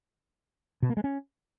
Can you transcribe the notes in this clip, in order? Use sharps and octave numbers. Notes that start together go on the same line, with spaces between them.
B2
A#3
G#3
C#4